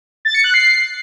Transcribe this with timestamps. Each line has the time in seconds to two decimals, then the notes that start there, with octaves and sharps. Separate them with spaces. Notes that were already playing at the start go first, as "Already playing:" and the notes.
0.25 A6
0.35 C#7
0.44 F#6
0.54 C7